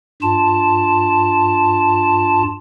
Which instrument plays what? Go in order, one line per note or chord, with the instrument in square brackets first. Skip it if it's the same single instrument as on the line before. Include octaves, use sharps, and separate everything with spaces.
[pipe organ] G2 F4 A5